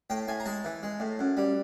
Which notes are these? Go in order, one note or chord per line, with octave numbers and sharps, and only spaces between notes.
A2 G5
A2 G#5
A#5
G#3 A5
E3
G#3
A2
F#2
G3